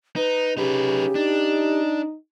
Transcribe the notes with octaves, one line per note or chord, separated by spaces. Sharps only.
D#4 B4
C#3 D#4 G4 B4
D4 D#4